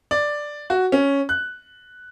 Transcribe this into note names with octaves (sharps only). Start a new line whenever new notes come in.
D5
F#4
C#4
F#6